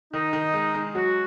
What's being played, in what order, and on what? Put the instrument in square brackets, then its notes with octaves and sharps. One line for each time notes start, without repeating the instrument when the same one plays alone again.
[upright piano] D#3 [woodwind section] D#4
[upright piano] D#3
G#3
G#3
[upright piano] F#3 [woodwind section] F#4